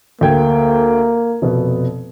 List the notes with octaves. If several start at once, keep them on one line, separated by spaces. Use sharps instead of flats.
D2 A#3 G5 G#6
F1 B2 B3